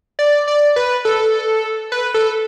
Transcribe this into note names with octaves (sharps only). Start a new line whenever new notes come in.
D5
D5
B4
A4
B4
A4